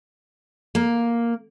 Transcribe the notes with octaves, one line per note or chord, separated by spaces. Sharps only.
A#3